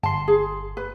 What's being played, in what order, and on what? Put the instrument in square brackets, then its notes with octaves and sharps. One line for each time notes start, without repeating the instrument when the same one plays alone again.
[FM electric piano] G1 C6 [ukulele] A5
[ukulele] G#4
B4